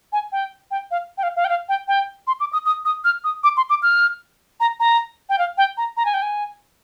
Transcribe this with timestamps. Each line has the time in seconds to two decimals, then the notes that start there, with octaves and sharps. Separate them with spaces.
0.12 G#5
0.32 G5
0.71 G5
0.91 F5
1.18 G5
1.23 F5
1.36 F5
1.45 G5
1.49 F5
1.69 G5
1.88 G5
2.27 C6
2.40 D6
2.53 D#6
2.66 D#6
2.85 D#6
3.04 F6
3.24 D#6
3.43 D6
3.57 C6
3.70 D6
3.82 F6
4.60 A#5
4.80 A#5
5.29 G5
5.38 F5
5.58 G5
5.77 A#5
5.97 A#5
6.05 G#5
6.14 G5
6.22 G#5